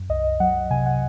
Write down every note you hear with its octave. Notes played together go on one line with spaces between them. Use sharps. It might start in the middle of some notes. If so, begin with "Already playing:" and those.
Already playing: F#2
C2 D#5
F#3 F#5
C3 G#5
F#5